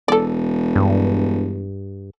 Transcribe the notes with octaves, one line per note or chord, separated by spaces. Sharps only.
E1 A4 D5
G2